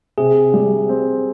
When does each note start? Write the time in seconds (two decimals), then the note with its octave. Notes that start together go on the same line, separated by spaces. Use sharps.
0.18 C3 G#4
0.54 G3
0.89 C4